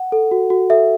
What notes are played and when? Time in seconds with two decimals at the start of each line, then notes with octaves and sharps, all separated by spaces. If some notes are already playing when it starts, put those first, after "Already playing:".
Already playing: F#5
0.12 A4
0.31 F#4
0.50 F#4
0.70 A4 E5